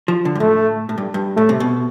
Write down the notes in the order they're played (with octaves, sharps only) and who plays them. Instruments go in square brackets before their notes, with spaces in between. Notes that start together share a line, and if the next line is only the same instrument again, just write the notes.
[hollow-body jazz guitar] F3
D3
G2
[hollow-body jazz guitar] A2 [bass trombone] A3
[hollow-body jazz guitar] A2
G2
G2
[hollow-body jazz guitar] A2 [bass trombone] A3
[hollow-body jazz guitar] C3
B2